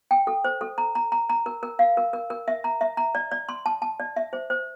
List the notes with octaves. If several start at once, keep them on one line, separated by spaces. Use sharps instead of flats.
G5
A4
C5
A4
A#5
A#5
A#5
A#5
A#4
A#4
F5
A#4
A#4
A#4
E5
A#5
E5
A#5
D5
D5
C6
A5
A5
D5
E5
C5
C5